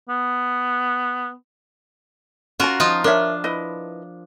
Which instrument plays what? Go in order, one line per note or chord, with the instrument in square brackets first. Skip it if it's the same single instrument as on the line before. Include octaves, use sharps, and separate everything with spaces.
[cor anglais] B3
[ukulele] C#4 A5 [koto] F4 F#4 A#4
[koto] F3 D#4 F4
[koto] D4 [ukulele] A#4 C#5 E5
[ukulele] E4 B4 D#5